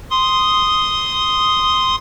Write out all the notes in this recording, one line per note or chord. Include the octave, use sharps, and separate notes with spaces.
C6 D#6